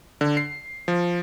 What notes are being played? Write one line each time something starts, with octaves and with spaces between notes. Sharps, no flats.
D3
C7
F3